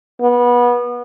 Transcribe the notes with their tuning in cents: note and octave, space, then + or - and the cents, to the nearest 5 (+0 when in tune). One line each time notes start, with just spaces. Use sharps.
B3 -25